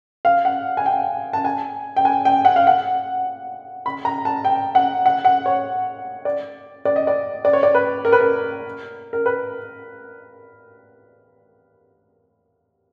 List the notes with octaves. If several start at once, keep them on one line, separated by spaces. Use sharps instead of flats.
F5
F#5
G#5
G5
A5
G#5
G5
G#5
G5
F#5
F5
F#5
B5
A#5
A5
G5
F#5
F#5
F#5
C#5
D5
D5
D#5
D5
D5
C#5
D5
B4
A#4
B4
A#4
A#4
B4